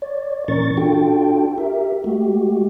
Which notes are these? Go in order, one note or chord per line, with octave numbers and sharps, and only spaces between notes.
C#5 D5
A#2 E3 C#4 A#4 C#6 A6
D4 F4 F#4 A4 G5
G4 A#4 E5
G#3 A3 F#4 G4